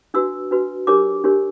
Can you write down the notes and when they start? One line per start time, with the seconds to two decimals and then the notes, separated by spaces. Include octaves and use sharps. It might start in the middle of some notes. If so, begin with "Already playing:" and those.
0.14 D4 F#4 B4 E6
0.51 D4 F#4 B4
0.87 D4 G4 A#4 C#5 D6
1.24 D4 G4 A#4 C#5